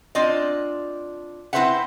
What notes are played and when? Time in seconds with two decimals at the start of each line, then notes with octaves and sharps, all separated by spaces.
0.15 C4 D4 F4 D5 D#5
1.53 C4 E4 B4 C5 E5 F#5